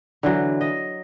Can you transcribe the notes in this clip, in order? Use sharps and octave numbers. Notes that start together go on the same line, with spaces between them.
D3 E3 F#3
D#5